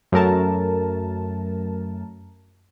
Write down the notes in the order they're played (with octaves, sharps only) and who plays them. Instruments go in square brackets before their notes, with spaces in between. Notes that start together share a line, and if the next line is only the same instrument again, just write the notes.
[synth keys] F#2 A3 A#4 A5